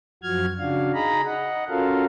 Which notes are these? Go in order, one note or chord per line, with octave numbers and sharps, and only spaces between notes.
F#2 F3 F#4 F6 G#6
C#3 D4 F#4 F5
D#4 G#4 D#5 A#5 B5
D#5 F#5
C#4 F4 F#4 A4 A#4 F5